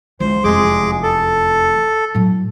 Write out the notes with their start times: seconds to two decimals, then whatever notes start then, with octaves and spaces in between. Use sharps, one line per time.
0.20 C#2 E3 C5
0.44 F1 E2 G#3 G#4 D6
1.03 A4
2.15 A2 F#3